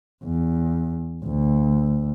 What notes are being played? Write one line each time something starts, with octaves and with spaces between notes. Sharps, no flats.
E2
D2